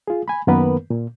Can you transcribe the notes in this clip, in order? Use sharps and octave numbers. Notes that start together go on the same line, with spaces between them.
F4 G#4
G#5 B5
F#2 D#3 A#3 B3 A#4 B4
A#2